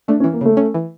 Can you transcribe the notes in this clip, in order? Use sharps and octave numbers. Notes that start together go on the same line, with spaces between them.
A3 D4
C#4
E3
A#3
C#3 A3
C#4
E3